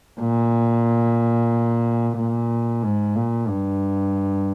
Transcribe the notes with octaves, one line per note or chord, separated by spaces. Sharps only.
A#2
A#2
G#2
A#2
G2